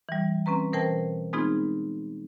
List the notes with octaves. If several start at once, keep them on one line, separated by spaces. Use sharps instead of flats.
E3 G3
C4 C#4 B4 A#5
B2 E3 A#4 C5 G5 A5
G#3 B3 C4 D#4 F4 G#4